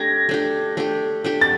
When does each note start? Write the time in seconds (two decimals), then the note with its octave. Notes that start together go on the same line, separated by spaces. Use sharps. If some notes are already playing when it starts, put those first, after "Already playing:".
Already playing: A3 D4 G4 G#6 A#6
0.29 A3 D4 G4
0.77 A3 D4 G4
1.24 A3 D4 G4
1.41 A6